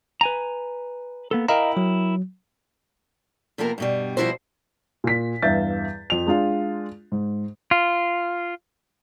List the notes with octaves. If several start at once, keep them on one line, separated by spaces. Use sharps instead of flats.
B4 G#5 A#5
A#3 B3 A4
E4 A#4 D#5 F5 G5 A#5
F#3
C3 F3 A#3 B3 A#4
G2 B2 G3
B2 F3 G3 E4 F#4 C5
A#2 B6
E2 G2 E5 F5 G6 A6
F2 F7
G#3 D4 F4
G#2
F4